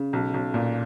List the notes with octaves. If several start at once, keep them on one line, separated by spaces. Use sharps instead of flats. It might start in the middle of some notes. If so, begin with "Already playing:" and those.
Already playing: C#3
B1
B1
A#2